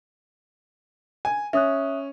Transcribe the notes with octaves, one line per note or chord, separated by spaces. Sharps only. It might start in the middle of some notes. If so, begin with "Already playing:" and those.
G#5
C#4 E5 D#6 F#6